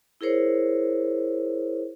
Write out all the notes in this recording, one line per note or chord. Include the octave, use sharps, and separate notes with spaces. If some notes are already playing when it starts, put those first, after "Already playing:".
E4 G#4 A#4 C5 C#5